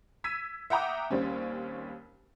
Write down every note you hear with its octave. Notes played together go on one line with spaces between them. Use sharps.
E6 G#6 B6 D#7
E5 F#5 G5 A#5 D6 D#6
D#2 G3 C4 C#4